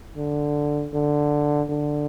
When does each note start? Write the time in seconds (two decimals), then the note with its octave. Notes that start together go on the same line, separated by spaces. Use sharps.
0.17 D3
0.94 D3
1.70 D3